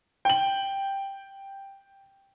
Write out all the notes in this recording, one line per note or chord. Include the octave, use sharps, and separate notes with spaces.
G5 F#7